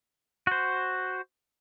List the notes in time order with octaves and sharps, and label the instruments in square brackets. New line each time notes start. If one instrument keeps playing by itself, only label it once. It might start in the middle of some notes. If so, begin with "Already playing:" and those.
[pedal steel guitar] F#4 C5